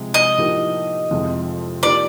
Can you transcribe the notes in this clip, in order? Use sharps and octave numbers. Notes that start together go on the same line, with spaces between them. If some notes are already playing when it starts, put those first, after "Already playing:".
Already playing: C3 F3 G#3
D#5
A2 F3 A#3 D#4 G4
F2 C3 F3 G#3
F3 A#3 D#4 G4 D5